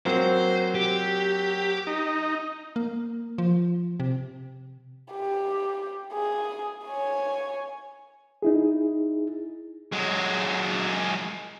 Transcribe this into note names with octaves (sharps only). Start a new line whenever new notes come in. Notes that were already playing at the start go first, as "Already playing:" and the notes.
F#3 A#3 C4 C5
G4
D#4
A#3
F3
C3
G4
G#4
C#5 G#5
D#4 E4 G#4
F#3 G#3